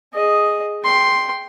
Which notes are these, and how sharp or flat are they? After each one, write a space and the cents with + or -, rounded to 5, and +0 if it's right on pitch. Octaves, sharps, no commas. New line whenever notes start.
G#4 +0 D#5 +0
G5 +0 C6 +0